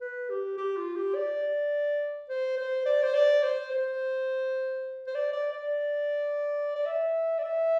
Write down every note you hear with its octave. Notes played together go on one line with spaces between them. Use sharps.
B4
G4
G4
F4
G4
D5
C5
C5
D5
C5
D5
C5
C5
C5
D5
D5
D5
D5
E5
D5
E5